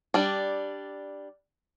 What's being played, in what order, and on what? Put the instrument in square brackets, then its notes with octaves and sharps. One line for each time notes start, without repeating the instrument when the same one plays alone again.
[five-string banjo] G3 D4